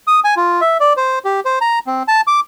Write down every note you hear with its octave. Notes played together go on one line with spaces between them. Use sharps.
D#6
G#5
F4
E5
D5
C5
G4
C5
A#5
C4
A5
D6